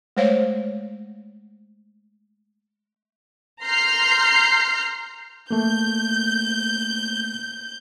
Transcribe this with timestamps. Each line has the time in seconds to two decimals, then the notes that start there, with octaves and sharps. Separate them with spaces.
0.17 G#3 A3 C5 C#5 F5
3.65 A#5 C6 F6 G6 C7
5.51 A3 A#3 G6